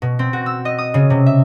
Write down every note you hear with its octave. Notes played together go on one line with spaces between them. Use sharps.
B2
C4
F#4
E6
D#5
D#6
C#3
C3
E5